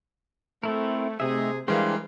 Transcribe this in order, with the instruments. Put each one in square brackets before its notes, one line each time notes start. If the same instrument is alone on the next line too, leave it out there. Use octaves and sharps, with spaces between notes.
[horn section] A3 [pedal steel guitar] C4 E4 A#4
[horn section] C3 G#4 [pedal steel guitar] A3 D#4 E5
[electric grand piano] E3 G#3 [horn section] G3 A#4 F5 [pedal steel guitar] D4 C5 G5